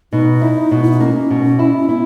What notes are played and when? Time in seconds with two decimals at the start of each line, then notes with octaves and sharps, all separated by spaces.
0.12 B2 D#4
0.42 E4
0.71 B2
0.84 E4
0.92 D#4
1.00 A#3 C#4
1.31 B2
1.59 E4
1.89 B3 E4